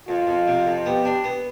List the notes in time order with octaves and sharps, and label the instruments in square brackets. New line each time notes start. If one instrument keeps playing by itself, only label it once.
[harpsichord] F2 [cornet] F4
[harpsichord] F2
C3
F2
[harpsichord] B3 [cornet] G4
[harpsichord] D4
B3